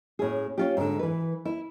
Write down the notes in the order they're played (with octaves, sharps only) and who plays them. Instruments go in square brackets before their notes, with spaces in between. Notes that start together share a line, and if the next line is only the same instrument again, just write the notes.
[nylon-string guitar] A2 C#4 G#4
C#4 F4 G4
G#2 D3
E3 B4
E4